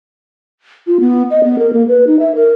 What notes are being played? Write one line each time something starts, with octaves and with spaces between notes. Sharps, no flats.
F4
B3
D#5
B3
A#4
A#3
B4
D#4
E5
A#4